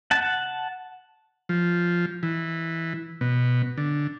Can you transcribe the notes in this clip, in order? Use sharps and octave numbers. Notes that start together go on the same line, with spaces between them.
F#5 A5
F3
E3
B2
D3